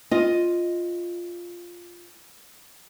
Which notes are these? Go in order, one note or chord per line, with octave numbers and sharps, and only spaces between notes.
F4 D#5